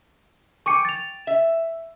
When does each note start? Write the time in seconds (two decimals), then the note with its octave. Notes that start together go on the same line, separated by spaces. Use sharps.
0.66 G5 G#5 C#6 D6 C#7
0.85 A6 F7
1.27 E5